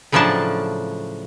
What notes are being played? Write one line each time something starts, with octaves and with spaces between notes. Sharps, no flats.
A2 C#3 F3 F#3 D4 A5